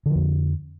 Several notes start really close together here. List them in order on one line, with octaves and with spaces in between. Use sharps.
D3 F3 F2